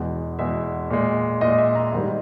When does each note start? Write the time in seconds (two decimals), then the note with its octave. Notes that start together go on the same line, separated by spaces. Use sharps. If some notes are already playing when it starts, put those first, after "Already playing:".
Already playing: E2 B2 G#3
0.39 E2 B2 G#3 E5
0.90 A#2 G#3
1.41 A#2 G#3 D#5
1.58 E5
1.75 A#5
1.92 G#2 D#3 G3